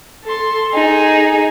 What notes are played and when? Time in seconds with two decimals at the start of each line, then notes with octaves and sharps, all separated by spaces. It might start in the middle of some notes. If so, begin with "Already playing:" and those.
0.25 A4 C6
0.74 D#4 G#4